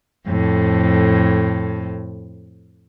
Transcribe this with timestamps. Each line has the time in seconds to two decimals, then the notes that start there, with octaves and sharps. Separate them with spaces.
0.26 F2 A2